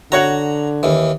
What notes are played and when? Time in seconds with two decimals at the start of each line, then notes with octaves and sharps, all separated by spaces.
0.12 D3 F#4 C#5 F#5 A#5
0.83 D#2 E3